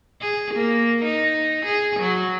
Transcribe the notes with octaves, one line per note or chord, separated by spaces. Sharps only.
G#4
A#3
D#4
G#4
F#3